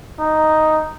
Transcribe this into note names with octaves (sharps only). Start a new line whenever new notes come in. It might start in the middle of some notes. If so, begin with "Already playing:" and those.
D#4